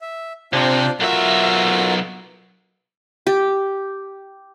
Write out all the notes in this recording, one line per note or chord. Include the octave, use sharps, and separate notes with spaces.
E5
C3 D4 F4 C5
B1 F4 F#4 A#4 E5
G4